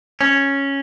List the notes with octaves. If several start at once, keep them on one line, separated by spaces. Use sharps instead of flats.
C#4